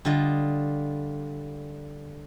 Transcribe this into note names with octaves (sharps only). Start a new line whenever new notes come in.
D3 G3 F4 D#5